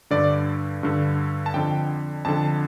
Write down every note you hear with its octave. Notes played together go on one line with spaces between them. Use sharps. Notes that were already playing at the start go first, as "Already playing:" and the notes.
G2 D3 D5
G2 D3
A5
F2 D3 G5
F2 D3 A5